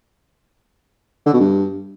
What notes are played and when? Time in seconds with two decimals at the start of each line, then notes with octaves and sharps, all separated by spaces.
1.26 D3
1.33 B2
1.40 G2